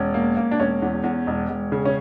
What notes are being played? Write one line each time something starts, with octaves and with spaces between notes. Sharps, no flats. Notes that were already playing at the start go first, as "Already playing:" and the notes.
Already playing: E1 C#4
A#3
A#3
D4
E1 C#4
E2
E2
E1
E1
C#3
C#4